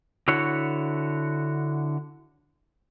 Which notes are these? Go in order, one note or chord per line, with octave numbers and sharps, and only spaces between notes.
D3 E4 F#4 C#5